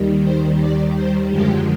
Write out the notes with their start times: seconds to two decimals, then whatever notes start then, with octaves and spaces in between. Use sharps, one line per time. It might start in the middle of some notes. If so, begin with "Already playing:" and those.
Already playing: D#2 D#3 G3
0.22 C5
0.58 D5
0.94 C5
1.29 F#2 D3 F3 G#3 G4